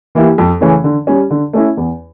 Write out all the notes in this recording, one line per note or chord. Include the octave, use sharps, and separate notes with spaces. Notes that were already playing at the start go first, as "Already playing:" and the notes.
E3 A#3 E4 G4
F2
C#3 E3 A3 C#4
D3
G3 C#4
D3
A3 C#4 E4
E2